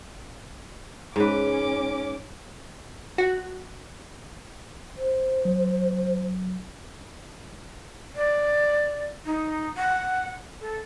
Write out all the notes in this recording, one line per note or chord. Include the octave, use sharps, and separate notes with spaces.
G#2 C#4 B4 D6
F#4
C5
F#3
D5
D#4
F#5
A4